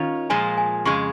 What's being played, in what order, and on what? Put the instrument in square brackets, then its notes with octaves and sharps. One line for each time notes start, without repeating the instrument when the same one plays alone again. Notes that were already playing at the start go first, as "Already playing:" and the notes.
Already playing: [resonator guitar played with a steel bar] D#3 C#4 F4
[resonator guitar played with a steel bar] A#2 F3 G#3 [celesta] G#5
[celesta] G#5
[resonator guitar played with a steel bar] F2 C#3 G#3 [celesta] C#6